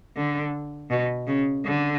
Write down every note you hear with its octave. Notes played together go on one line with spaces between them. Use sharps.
D3
B2
C#3
D3